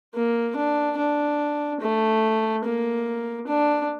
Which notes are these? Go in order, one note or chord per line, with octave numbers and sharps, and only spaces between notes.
A#3
D4
D4
A3
A#3
D4